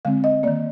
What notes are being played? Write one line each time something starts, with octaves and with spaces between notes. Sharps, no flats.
D3 G#3 C4 F5
D#5
D#3 A#3 D5